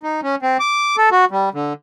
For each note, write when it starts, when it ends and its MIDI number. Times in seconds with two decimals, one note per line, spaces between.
0.03 0.21 63
0.23 0.35 61
0.42 0.57 60
0.60 0.96 86
0.97 1.09 69
1.12 1.25 66
1.31 1.49 55
1.54 1.73 50